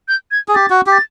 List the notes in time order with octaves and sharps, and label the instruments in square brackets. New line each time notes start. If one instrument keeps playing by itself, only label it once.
[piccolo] G6
G#6
[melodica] G#4
[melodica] G4 [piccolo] A6
[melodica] F#4
G4
[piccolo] A6